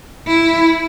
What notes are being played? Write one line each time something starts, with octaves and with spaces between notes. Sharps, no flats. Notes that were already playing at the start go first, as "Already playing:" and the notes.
E4